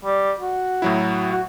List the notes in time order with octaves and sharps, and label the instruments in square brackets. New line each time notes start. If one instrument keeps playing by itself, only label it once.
[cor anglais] G3
F#4
[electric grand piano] A2 F#3 E4
[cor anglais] F#4